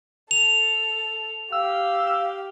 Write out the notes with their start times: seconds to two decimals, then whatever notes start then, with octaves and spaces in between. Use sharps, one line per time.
0.31 A4 F7
1.52 G4 F5 E6